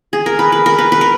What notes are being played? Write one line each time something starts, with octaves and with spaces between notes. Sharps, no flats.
G#4
A#4
B4
B4
A#4
B4
B4
A#4